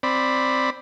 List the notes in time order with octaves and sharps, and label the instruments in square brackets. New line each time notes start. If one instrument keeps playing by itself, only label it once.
[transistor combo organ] C4 D5 B5